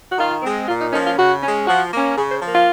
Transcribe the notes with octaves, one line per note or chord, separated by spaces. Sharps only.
F#4
D#3 F4
G#3 C4
A#2 F4
D#4
F3 A#3 C#4 D#4
F4
C#3 F#4
G#3 C#4
F3 F#4
A#3 C#4
C#3 G#4
C5
F3 A#3
F4